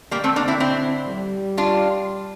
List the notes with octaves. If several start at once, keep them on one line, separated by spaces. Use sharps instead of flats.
D3 G3 A#3
A3 C4
A#3 D4
C4 E4
C4 E4
G3
D4 F4